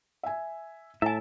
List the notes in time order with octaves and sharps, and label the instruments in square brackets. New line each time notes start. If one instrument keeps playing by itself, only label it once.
[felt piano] E5 G#5
[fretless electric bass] A2 [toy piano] E4 G#5 [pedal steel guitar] E5 A5